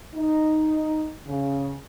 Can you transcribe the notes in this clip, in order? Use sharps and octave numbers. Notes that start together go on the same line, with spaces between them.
D#4
C#3